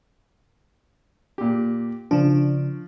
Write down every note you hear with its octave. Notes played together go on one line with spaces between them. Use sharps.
A#2 G4
C#3 F3 D4